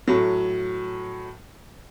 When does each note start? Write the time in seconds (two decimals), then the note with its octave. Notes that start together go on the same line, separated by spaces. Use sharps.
0.08 A2 F#3